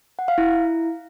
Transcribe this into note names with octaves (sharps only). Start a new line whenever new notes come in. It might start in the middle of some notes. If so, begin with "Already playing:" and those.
F#5
F5
E4